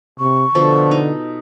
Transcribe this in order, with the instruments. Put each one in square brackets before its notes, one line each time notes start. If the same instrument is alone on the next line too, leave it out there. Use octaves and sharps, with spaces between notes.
[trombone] C3 [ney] C#6
[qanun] B2 F3 A4 [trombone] D3
[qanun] D#4